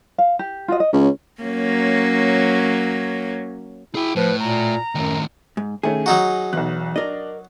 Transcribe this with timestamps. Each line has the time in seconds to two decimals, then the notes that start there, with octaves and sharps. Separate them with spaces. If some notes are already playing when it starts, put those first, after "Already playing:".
0.18 F5
0.39 G4
0.68 F4 F#4 D#5
0.80 D#5
0.93 C#2 C#4
1.41 F#3 A#3 C#4
3.95 E4 G#4 G5
4.16 A2 F3 B4
4.39 A#2 A#5
4.95 F#2 A2 D#3
5.57 G#2
5.83 D#3 A3 C#4 G#4
6.06 F#3 D#4 F#4 A#5
6.53 B1 E2 F#6
6.96 D4 A#4 D#5